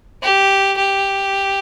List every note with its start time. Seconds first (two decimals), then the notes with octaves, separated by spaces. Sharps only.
0.22 G4
0.77 G4